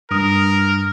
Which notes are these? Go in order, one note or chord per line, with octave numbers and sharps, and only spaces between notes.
G2 A#4 D#6